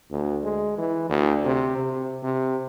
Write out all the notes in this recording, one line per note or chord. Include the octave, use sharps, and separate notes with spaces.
D2
G#3
E3
D2
C3
C3
C3